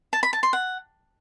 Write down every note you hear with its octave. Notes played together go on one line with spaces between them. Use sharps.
A5
B5
A5
C6
F#5